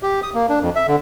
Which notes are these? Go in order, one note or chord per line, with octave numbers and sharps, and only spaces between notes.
G4
D#6
A#3
D4
F2
E5
D3